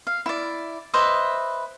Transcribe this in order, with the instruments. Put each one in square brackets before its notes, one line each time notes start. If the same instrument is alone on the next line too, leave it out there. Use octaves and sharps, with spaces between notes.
[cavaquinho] F5
E4 D5
B4 C5 D#5 E5